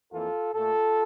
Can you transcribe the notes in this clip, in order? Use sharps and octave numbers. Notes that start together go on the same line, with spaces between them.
F2 E3 A#3 F4 A4
A#2 A3 F4 A4